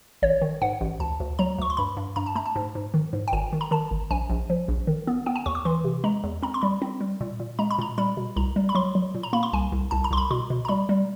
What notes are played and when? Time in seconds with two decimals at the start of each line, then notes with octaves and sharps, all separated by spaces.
0.22 A1 C#5
0.42 D#3
0.62 G#2 F#5
0.81 A1
1.00 D2 A5
1.20 D2
1.39 F#3 A#5
1.58 D2 C#6
1.70 C6
1.77 G2 B5
1.97 G2
2.16 G2 A#5
2.26 A5
2.35 A3 A#5
2.46 A5
2.56 G#2
2.75 G#2
2.94 D#3
3.13 G#2
3.28 G5
3.32 G#1 G#5
3.53 D#3
3.61 A#5
3.71 D#3 A5
3.91 G#1
4.11 A#1 G#5
4.30 A#1
4.50 F3
4.68 A#1
4.87 D#3
5.07 B3
5.26 B3 G5
5.36 G#5
5.46 D#2 C#6
5.55 D6
5.65 E3 C6
5.84 C3
6.04 G#3 A#5
6.24 E2
6.43 C4 A#5
6.54 C6
6.62 G3 B5
6.82 C4
7.01 G3
7.21 A#2
7.40 A#2
7.59 G#3 A#5
7.71 B5
7.79 A#2 A#5
7.98 G3 B5
8.17 B2
8.36 C2 A#5
8.56 G3
8.69 B5
8.75 F#3 C6
8.95 F#3
9.14 A#2
9.23 A#5
9.33 A#3 B5
9.43 C6
9.53 C2 G#5
9.72 C2
9.91 C2 A5
10.04 A#5
10.11 C2 C6
10.17 B5
10.31 B2 C6
10.50 B2
10.65 A#5
10.68 G3 B5
10.89 G3